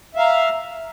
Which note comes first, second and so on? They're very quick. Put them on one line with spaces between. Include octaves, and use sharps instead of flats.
E5 F5 A#5